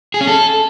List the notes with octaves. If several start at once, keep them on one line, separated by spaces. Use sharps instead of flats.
G#4
C#4
A4